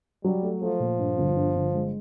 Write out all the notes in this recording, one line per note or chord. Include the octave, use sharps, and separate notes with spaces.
F#3 G3
A3
F3 A3
A#2
G2
G1
G2
G1
G#3